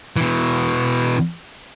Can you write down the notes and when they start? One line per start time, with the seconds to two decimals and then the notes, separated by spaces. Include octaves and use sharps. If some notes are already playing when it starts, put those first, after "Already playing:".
0.17 B2 E3